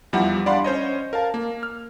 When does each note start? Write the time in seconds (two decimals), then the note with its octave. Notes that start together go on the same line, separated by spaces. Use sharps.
0.13 E2 F3 G3 E4 F#5
0.46 D4 D5 F5 F#5 B5 C6
0.64 C#4 C5 C#5 D#5
1.13 A#4 F5 A5
1.34 A#3
1.63 F6